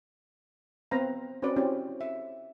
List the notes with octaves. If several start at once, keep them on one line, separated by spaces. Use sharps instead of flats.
B3 C4 B4 F5 A#5
C4 C#4 F#4 B4 D5
C4 C#4 E4 F#4 G4 D5
E5